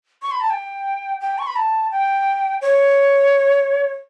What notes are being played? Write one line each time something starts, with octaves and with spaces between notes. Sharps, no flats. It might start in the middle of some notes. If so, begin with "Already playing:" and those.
C#6
B5
A5
G5
G5
C#6
B5
A5
G5
C#5